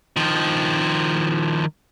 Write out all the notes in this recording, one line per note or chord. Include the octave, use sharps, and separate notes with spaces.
D#3 F3